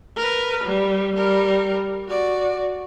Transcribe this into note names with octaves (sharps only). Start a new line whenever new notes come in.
A#4 B4
G3
G3 A#4
F#4 D5